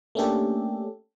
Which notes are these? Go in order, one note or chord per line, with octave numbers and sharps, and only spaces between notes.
A3 A#3 C#4 D4 G4 A4